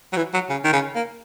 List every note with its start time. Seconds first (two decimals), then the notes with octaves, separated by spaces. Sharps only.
0.13 F#3
0.17 E3
0.34 F#3
0.49 C#3
0.64 D#3
0.73 C#3
0.95 A#3